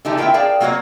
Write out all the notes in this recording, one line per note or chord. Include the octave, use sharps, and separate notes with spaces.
D3 E3 D#4 G4 A5
E4 F4 A#4 C#5 E5 G5
G#4 A#4 D5 F5 G5 A5
F#3 A#3 F4 F#4 C#5 D#5